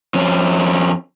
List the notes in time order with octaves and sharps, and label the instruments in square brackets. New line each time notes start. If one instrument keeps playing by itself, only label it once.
[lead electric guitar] F2 C#4